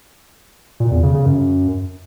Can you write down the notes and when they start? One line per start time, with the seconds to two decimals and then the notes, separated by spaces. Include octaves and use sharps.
0.80 A#2
0.91 E2
1.03 C#3
1.14 C#3
1.26 F#2